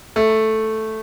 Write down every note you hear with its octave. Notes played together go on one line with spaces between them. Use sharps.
A3